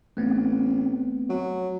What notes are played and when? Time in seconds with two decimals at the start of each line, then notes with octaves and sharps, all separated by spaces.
0.17 A1 A3 B3 C4
1.29 F#3